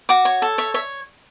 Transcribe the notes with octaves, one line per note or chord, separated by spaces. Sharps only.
F#4 D6
C#5
A4
C#5 E5
C#5 E5